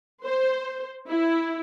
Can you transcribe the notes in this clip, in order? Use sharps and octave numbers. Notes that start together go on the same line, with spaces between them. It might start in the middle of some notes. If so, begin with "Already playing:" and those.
C5
E4